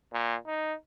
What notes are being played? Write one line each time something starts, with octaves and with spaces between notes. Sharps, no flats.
A#2
D#4